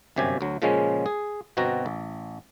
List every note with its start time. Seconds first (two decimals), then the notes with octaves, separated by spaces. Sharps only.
0.16 G1 F#2 C3 G4 G#5
0.41 D2 F#3
0.62 A#2 C#3 F3 G#3 C#4
1.06 G#4
1.57 G1 B2 C4 F#4 A#5
1.86 A1